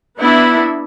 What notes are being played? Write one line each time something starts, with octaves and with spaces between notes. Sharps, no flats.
B3 D4 E4